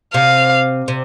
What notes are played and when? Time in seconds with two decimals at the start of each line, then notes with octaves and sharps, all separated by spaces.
0.14 C3 F5
0.88 C3